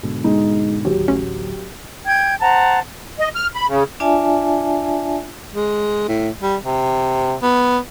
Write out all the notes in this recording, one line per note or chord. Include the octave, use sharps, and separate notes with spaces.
G#2 B2 D3
G#3 D#4
D1 D#2 F#3 G4
A1 C#4
G5 G6 G#6
C5 F#5 A5 A#5
D#5
F6
B5
C#3
D4 F4 D5 E5 G#5 A5
G#3
A2
G3
C3
B3